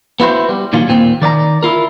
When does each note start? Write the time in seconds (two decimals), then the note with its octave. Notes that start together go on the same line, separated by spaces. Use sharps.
0.20 B3 E4 F#4 C5
0.49 G3
0.73 A#2 D#3 F#3 F4
0.88 D#2 A#2 C4
1.22 D#3 D5 E5 A#5
1.63 E4 F4 A#4